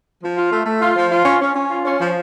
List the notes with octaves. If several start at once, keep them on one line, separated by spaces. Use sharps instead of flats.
F3
F4
A3
A3
F4
F3
F4
C#4
C#4
C#4
F4
C#4
F3